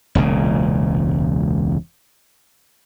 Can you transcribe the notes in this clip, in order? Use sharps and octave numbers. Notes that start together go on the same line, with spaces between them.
E1 C#2 A#2 C#3